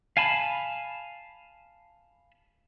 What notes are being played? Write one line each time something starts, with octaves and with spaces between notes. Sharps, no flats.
F5 G#5 A5 B5